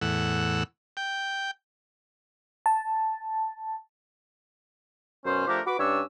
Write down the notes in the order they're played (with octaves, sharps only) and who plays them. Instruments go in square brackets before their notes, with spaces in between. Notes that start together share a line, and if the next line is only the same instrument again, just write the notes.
[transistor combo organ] E2 A2 F#5 E6
G5
[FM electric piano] A5
[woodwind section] F#2 B2 C#4 C5
F3 A3 D4 G4 A#4
F#4 B4 B5 D6
G2 C#4 D4 C#5 E6